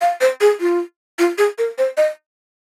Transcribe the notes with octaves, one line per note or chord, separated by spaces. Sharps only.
F5
C5
G#4
F4
F4
G#4
A#4
C5
D#5